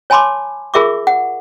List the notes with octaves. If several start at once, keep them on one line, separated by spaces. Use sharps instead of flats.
C#5 G#5 A5 B5 C6 D6
F4 G#4 A#4 E5 C#6 D6
F#5